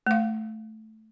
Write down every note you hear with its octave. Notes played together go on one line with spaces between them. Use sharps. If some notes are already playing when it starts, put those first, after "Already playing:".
A3 F5